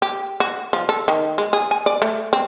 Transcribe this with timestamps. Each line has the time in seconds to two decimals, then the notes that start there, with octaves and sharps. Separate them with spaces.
0.02 G4
0.40 F#4
0.73 F3
0.89 A4
1.08 D#3
1.38 G#3
1.53 G#4
1.71 G#5
1.86 D5
2.02 A3
2.33 C4